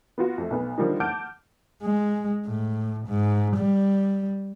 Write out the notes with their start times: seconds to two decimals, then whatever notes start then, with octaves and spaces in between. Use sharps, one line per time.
0.18 B3 F4 F#4
0.38 F2 A3
0.50 B1 B3
0.78 D3 D#3 F3 G3 A#3 D#4
1.00 F#5 A5 D6 F6 G6 D7
1.82 G#3
2.47 A2
3.07 G#2
3.56 G3